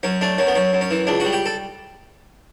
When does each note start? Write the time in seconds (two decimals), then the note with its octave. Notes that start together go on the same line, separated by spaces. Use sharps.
0.03 F#2 C#4
0.21 A3 D4
0.38 F#2 C#4
0.47 B3
0.55 F#2 C#4
0.73 F#2
0.81 C#4
0.91 E3
1.07 C#2 D4
1.20 G3 F#4
1.33 G4
1.46 A4